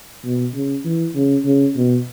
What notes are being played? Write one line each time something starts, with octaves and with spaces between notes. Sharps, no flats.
B2
C#3
E3
C#3
C#3
B2